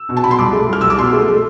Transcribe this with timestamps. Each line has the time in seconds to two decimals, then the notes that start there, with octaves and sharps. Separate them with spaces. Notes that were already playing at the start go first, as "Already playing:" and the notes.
Already playing: E6
0.09 B2
0.17 A5
0.24 B2 B5
0.31 C6
0.39 C2 D6
0.53 A3
0.69 C2 F6
0.81 C2 E6
0.90 D6
0.98 B2 C6
1.13 A3
1.28 A3